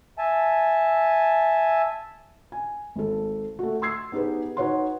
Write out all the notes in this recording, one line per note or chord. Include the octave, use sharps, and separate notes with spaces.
E5 G#5 A5
G#5
G#1 A4
A3 F#4
C6 E6 G#6 C7
B3 D#4 G4 G#4 B4
D#4 F#4 B4 C#5 F#5 C6